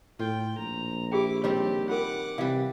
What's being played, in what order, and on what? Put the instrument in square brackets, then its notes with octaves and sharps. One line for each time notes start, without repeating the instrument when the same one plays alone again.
[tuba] A2 [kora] F4 [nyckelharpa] G5
[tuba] A#1 [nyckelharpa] A#5
[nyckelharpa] E4 D6 [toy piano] G4 G#4 G5
[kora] D#3 G3 C4 [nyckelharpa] G4 [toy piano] C#5
[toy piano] F4 A#4 [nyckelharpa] F#5 D6
[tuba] C3 [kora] E3 G3 [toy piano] F5